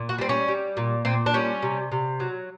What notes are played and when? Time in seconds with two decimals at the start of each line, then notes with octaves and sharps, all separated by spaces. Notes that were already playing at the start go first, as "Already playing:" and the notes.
Already playing: A#2
0.09 F#4
0.18 G3 C4
0.29 C#4
0.48 G3
0.77 A#2
1.05 A#2 C4
1.26 D4
1.34 G3 C#4
1.62 C3
1.92 C3
2.20 F#3